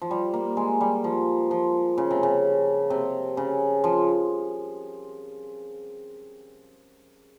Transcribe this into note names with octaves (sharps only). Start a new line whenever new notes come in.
F3
G3
A#3
G#3
G3
F3
F3
C#3
C3
C#3
C3
C#3
F3